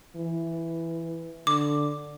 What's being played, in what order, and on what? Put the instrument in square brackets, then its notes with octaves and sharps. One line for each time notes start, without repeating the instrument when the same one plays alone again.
[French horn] E3
[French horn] D3 [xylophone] D6